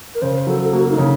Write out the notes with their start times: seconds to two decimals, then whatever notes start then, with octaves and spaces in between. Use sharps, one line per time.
0.15 A#4
0.22 C#3 C5
0.47 F#3 A4
0.64 A4
0.73 A#3 F#4
0.90 D#4
0.98 C#3